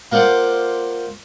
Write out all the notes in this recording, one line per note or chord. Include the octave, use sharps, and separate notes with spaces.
A#3 F4 C5 D5 F#5